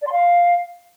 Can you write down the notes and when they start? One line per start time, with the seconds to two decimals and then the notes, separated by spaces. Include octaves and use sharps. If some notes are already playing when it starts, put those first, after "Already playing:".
0.01 D5
0.06 C6
0.11 F5